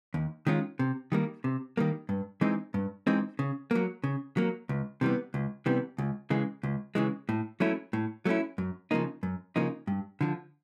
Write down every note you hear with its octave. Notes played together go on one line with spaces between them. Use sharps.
D#2
D#3 G#3 C#4 F4
C3
D#3 G3 A#3
C3
D#3 G3 A#3
G2
E3 G#3 C4 D#4
G2
E3 G#3 C4 D#4
C#3
F#3 A#3
C#3
F#3 A#3
C#2
C3 E3 G3 B3
C#2
C3 E3 G3 B3
C#2
C#3 E3 G#3
C#2
C#3 E3 G#3
A2
F#3 A3 C#4 E4
A2
F#3 A3 C#4 E4
F#2
C#3 F3 A#3 D#4
F#2
C#3 F3 A#3 D#4
G2
D3 F3